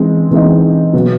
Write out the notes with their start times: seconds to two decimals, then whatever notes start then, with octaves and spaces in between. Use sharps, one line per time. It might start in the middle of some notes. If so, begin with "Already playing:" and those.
Already playing: E3 G#3 C4 D#4
0.31 E3 G#3 C4 D#4
0.93 B2 F#3 B3